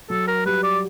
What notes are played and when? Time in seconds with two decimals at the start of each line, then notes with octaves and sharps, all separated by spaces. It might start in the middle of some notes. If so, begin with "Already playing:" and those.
0.10 F#3 A4
0.28 A#4
0.46 G3 B4
0.63 D5